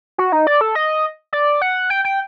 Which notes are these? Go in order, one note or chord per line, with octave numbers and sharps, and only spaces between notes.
F#4
D#4
D5
A4
D#5
D5
F#5
G5
G5